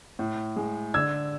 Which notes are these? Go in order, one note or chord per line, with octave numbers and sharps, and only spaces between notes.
A2
G#3
D3 E6 G#6